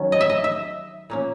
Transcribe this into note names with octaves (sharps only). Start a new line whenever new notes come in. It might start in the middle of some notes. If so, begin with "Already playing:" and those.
Already playing: D#3 F#3 C#4
D#5
E5
D#5
E5
A#2 A#3 C#4